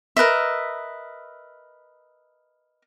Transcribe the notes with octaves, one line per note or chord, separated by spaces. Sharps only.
A#4 B4 D#5 E5